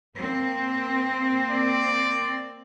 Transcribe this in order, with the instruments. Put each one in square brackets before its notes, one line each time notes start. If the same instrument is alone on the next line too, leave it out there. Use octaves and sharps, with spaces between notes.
[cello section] A#3 C4
[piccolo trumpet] D5